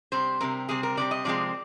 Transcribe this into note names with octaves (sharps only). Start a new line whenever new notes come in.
C3 G3 C4 C5
C3 G3 C4 A#4
C3 G3 C4 G#4
A#4
C3 G3 C4 D5
D#5
C3 F3 G#3 C4 D5